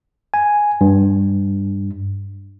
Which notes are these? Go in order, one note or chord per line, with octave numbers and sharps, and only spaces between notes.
G#5
G2